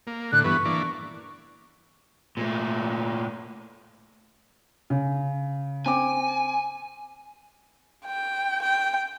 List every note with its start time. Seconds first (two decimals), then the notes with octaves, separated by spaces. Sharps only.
0.07 A#3
0.32 A2 D3 F#6
0.44 G2 E3 B3 C#6
0.65 E3 A#3 D4
2.37 A#2 A3
4.90 C#3
5.86 C4 G#5 D6
8.06 G5
8.62 G5